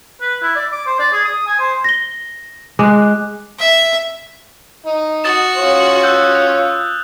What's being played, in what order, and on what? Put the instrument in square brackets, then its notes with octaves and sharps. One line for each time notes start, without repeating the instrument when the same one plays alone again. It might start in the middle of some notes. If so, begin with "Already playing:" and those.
[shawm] B4
E4
D5
D6
C5
D5
G#4
D#6
G#5
C5
[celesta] A#6 G7
[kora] G#3 [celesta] D6 F#6
[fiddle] E5
[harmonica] D#4
[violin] F#4 [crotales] D#6 A6 E7
[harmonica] C#4 F4 C#5
[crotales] E6 F#6 G6
F7